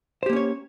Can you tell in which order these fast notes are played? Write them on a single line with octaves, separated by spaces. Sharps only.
C5 G4 A#3 C#4 C#5